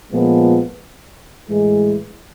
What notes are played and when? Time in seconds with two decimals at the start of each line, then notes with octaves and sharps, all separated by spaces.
0.13 A#2 F3 G#3 B3
1.49 A2 E3 G#3